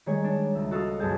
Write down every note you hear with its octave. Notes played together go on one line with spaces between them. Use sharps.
D#3 G3 G#3 G#4 C#5
D4
C#2 E5
F#4 A4 D#5 F5 F#5 D#6
B1 F#2 C#4 G#4 A5 G6